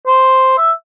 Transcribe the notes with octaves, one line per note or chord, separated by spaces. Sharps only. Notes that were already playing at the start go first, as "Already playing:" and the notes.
C5
E5